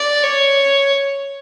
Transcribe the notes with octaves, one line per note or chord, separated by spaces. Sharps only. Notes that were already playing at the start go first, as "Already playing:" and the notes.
Already playing: D5
C#5